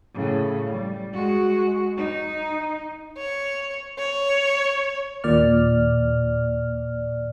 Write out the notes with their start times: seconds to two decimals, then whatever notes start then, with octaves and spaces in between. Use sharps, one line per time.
0.14 A2 C#3
0.71 G3
1.14 G#3 F#4
1.97 D#4
3.18 C#5
3.99 C#5
5.24 D#2 A#2 D5 F6